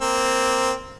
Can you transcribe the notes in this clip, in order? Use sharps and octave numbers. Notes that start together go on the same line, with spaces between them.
A#3 C4